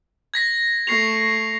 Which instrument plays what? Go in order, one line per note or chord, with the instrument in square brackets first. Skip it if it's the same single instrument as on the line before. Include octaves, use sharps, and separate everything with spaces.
[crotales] G#6 A#6 B6
[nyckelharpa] A3 C#6 [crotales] A#6 C7 F7